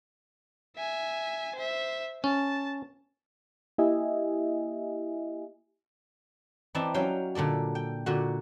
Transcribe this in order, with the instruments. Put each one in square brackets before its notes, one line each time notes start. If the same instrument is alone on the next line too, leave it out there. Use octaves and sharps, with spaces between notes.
[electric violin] E5 G#5
C5 E5
[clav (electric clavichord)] C#4 [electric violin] A5
[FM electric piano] A#3 E4 G4 D#5 E5 G#5
[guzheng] E3 C4 D#4 E4 D5 A5
F#3 C#4 F5 G5
A#2 D3 A4 D5
G5
A#2 D3 F#4